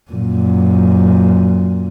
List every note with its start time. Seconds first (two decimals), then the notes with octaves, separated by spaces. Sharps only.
0.11 F#2 A#2